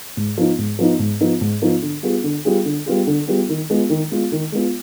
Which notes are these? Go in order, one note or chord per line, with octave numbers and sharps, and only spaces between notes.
G#2
F3 B3 D#4
G#2
F3 B3 D#4
G#2
F3 B3 D#4
G#2
F3 B3 D#4
D3
G3 B3 F4 G#4
D3
G3 B3 F4 G#4
D3
G3 B3 F4 G#4
D3
G3 B3 F4 G#4
D#3
G#3 B3 F4
D#3
G#3 B3 F4
D#3
G#3 B3 F4